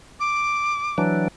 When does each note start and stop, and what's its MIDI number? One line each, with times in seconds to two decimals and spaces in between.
0.20 1.01 86
0.98 1.28 52
0.98 1.28 54
0.98 1.28 62